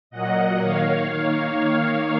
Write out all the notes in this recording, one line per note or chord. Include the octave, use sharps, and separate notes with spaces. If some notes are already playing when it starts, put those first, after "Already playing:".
A#2 F#3 A#3 D#5 F#5
D#3 A#3 C#5 F5